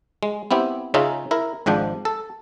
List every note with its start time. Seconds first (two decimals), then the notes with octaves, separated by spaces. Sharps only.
0.23 G#3
0.51 B3 C4 E4 G4
0.94 C#3 C#4 D#4 F4 E5
1.31 E4 A#4
1.66 G#1 G#2 F3 D4 G5
2.05 A4